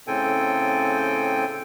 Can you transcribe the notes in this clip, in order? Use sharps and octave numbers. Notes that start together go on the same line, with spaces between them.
A2 C#3 C4 A4 G5 G#5